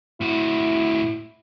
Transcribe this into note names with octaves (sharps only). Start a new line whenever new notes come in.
A2 E4 F#4